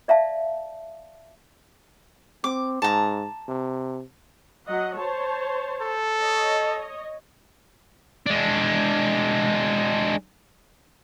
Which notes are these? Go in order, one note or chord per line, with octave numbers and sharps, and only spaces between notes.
D5 E5 F5 A5
C4 D6
G#2 A5 A#5
C3
F#3 D#5 F#5
C5 C#5 A5
A4
C#5 D#5
G#3 D4